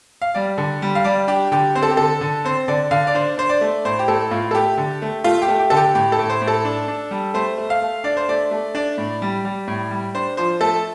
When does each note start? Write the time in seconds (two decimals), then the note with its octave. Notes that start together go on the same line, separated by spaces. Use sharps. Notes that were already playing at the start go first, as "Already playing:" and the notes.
0.22 F5
0.34 G3 D5
0.58 D3
0.82 G3
0.95 F5
1.04 G3 D5
1.28 D4 G4
1.52 D3 G4
1.75 C4 C5
1.83 A4
1.90 G4
1.97 D3 A4
2.21 D3
2.45 C4 C5
2.68 D3 D5
2.91 D3 F5
3.07 D5
3.15 D4 C5
3.38 D4 C5
3.49 D5
3.61 A3
3.85 A2 C5
3.99 G4
4.08 A2 A4
4.31 A2 F4
4.51 A4
4.55 A3 G4
4.78 D3
5.02 A3
5.24 A3 F4
5.42 G4
5.48 A3
5.59 G4
5.70 D3 A4
5.77 G4
5.95 A2 G4
6.12 A4
6.19 A2
6.30 C5
6.41 A2
6.48 A4
6.65 D4
6.88 D4
7.11 G3
7.34 A3 C5
7.58 A3
7.70 F5
7.82 A3
8.04 D4 D5
8.17 C5
8.29 A3 D5
8.51 A3
8.75 D4 D5
8.98 A2
9.22 G3
9.45 G3
9.67 A2
9.91 G3
10.15 D4 C5
10.37 F3 C5
10.61 A3 A4